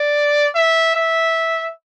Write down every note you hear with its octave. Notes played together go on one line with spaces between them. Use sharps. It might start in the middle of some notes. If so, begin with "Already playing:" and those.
Already playing: D5
E5
E5